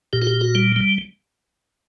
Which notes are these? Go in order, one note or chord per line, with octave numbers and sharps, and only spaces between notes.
A#2 G4
F#4
G4
F#4
G3
G3